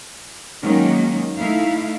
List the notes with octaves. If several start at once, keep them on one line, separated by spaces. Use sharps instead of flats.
D#3 F#3 G#3 A#3 C#4
A3 D#4 E4 F5